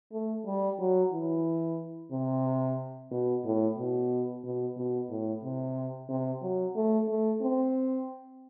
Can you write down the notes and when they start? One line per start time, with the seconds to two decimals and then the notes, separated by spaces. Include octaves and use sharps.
0.13 A3
0.46 G3
0.79 F#3
1.12 E3
2.11 C3
3.11 B2
3.44 A2
3.78 B2
4.43 B2
4.77 B2
5.10 A2
5.43 C3
6.09 C3
6.42 F#3
6.75 A3
7.09 A3
7.42 C4